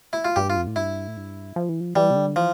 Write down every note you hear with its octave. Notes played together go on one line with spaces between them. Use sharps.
E4
F4
G2 G4
F4
F2
A2
G2 E4
A2
G2
F3
E3
F3
E3 G3
C3
D3
E3 F3